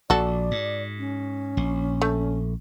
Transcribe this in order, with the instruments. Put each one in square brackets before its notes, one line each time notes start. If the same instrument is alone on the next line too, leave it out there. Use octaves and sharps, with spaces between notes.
[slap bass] A#1 [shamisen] F#4 A4 [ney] D5
[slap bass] G#2
[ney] C#4
[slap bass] A#1
[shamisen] A3